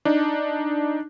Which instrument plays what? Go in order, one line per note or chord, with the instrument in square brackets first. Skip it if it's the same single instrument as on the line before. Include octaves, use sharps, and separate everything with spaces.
[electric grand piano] D4 D#4